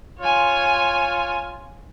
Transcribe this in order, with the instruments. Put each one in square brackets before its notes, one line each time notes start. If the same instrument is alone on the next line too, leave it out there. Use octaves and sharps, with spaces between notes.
[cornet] F4 [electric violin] C#5 G#5